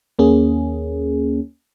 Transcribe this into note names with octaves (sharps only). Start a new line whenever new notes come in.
D#2 A#3 C#4 G#4